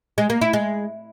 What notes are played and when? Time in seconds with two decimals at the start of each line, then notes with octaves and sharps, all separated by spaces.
0.18 G#3
0.30 A#3
0.41 E4
0.53 G#3